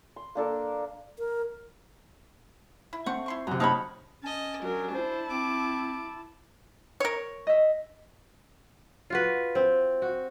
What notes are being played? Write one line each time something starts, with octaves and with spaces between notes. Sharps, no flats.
C6
A#3 D4 A4 A#4
A#4
E4
A3 C4 F#5 C#6
E4 C6 C#6
F#2 C3 A#5
D#4 C#5 F5 A5 B5
C#4 D#5 A5
F#3 D4 A#4
E4 C5 A5
C4 D6
A#4 C#5
D#5 E5
F4 F#4 B4
C4
F#4